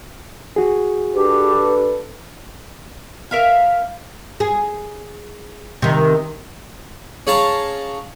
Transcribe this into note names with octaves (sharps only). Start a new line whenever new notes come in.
F#4 G#4
D4 G4 A4 B4
A#4 E5 F5
G#4
C3 D#3
C#4 G#4 F5 A5 A#5